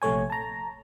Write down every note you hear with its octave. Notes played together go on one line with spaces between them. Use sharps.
A#1 C3 A3 C#5 G#5
A5 A#5